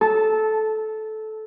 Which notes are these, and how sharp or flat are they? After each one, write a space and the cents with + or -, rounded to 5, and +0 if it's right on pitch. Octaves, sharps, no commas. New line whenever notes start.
A4 -15 A5 +0